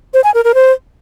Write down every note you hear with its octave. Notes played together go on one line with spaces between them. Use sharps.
C5
G#5
A#4
A#4
C5